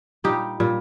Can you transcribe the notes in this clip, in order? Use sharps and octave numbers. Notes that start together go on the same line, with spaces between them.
A#2 G3 D#4 G4
A#2 G3